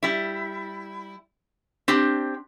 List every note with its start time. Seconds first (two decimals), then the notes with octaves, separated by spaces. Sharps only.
0.03 G3 E4
1.88 C4 D4 G4